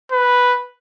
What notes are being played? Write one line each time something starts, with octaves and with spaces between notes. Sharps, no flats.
B4